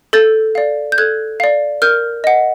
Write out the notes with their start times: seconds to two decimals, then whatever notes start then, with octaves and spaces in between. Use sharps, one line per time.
0.13 A4 G6 A6
0.55 D5 F5
0.92 G6
0.98 A4 F#6 G#6
1.40 D5 F5
1.82 A#4 F6 G6
2.24 D#5 F#5